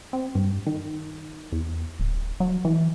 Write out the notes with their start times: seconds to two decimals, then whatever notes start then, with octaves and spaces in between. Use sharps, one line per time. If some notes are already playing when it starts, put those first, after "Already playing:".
0.13 C4
0.35 G2
0.67 D#3
1.52 E2
2.00 D1
2.40 F#3
2.65 E3